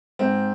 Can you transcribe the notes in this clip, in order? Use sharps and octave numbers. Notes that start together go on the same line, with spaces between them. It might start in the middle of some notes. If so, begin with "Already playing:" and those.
G#2 C4